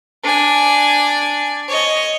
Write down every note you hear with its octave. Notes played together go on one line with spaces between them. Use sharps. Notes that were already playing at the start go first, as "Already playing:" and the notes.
D4 G#5
C#5 D#5